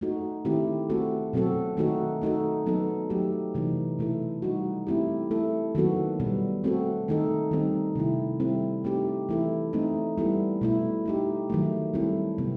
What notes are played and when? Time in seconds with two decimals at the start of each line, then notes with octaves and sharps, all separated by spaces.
0.01 A3 D#4 F#4 A4
0.45 D#3 A3 C4 E4 G4
0.90 A3 C4 F#4 A4
1.33 B2 F#3 C4 F#4 A4
1.77 D#3 A3 D#4 F#4 A4
2.22 A3 D#4 F#4 A4
2.66 F#3 B3 D#4 A4
3.10 F#3 A3 D#4 G4
3.54 C3 E3 A3 D#4
3.99 B2 A3 E4 A4
4.42 G3 D#4 F#4
4.87 A3 C4 E4 G4
5.31 A3 E4 A4
5.75 D#3 F#3 B3 F#4 A4
6.20 B2 G3 B3
6.64 A3 C4 F#4 A4
7.08 D#3 A3 D#4 A4
7.51 D#3 G3 C4 D#4 A4
7.95 C3 D#3 A3 E4
8.40 G3 C4 E4 A4
8.84 A3 C4 D#4 G4
9.29 E3 A3 E4 A4
9.73 A3 C4 D#4
10.17 G3 B3 E4 A4
10.61 B2 A3 E4
11.06 A3 D#4 G4
11.50 D#3 F#3 A3
11.94 G3 C4 E4 A4
12.38 C3 F#3 B3